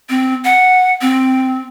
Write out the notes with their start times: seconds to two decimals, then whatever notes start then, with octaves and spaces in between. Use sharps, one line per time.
0.09 C4
0.45 F#5
1.01 C4